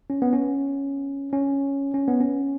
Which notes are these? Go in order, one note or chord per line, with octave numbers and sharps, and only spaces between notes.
C#4
B3
C#4
C#4
C#4
B3
C#4